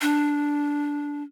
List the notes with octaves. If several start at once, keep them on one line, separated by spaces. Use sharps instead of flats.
D4